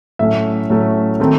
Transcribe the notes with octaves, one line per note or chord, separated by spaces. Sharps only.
A2 F#3 A3 C#4 E5
A2 F#3 A3 C#4
D#3 A3 C4